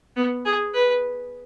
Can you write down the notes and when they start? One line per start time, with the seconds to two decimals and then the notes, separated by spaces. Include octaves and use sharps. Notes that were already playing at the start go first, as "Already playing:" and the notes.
0.16 B3
0.45 G#4
0.74 B4